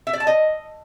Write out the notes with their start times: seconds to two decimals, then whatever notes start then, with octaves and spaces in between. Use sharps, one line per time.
0.07 E5
0.13 D5
0.20 A5
0.27 D#5